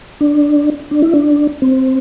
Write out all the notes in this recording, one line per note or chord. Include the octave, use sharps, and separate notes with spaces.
D4
D4
E4
D4
C4